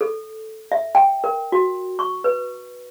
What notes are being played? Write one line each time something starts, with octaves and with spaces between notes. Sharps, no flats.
A4
E5
G5
A#4
F#4
C#6
B4